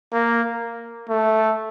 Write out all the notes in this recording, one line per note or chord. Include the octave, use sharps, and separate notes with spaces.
A#3
A3